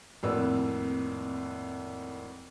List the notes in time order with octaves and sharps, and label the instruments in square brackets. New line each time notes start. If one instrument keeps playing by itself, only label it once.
[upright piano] G#1 F2 A2 A#3 B4 E6